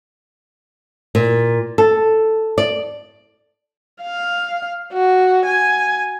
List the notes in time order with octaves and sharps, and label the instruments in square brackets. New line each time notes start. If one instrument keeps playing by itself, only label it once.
[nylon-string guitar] A#2
A4
D5
[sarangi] F5
F#4
G#5